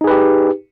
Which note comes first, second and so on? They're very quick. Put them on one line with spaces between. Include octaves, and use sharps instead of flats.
D#4 G#4 B4 G4